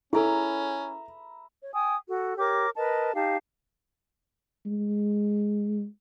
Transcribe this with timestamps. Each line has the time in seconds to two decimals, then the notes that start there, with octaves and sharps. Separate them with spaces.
0.13 C#4 E4 G#4 A4 E5 A#5 B5
1.61 C#5
1.73 G5 G#5 D#6
2.07 F#4 A4
2.38 G4 A#4 C#5 D6
2.76 A#4 B4 D#5 A5
3.14 D#4 G4 F5 A5
4.66 G#3